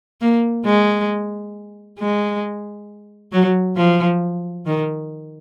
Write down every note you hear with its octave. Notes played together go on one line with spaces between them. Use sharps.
A#3
G#3
G#3
F#3
F3
D#3